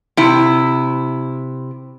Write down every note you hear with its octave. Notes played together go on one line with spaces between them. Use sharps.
C3 E4